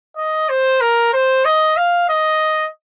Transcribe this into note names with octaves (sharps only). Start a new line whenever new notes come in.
D#5
C5
A#4
C5
D#5
F5
D#5